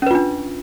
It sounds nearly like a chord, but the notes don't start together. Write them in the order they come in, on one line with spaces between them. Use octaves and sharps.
C#4 B4 F4 D4